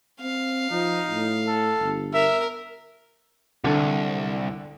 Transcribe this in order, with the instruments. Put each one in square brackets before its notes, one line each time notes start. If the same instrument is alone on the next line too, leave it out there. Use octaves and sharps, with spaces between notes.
[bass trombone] C4 [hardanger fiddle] F5
[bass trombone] F3 [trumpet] D#4
[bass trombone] A2
[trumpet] A4
[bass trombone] G1
[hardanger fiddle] A#4 [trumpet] E5
[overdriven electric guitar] C2 [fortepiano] D3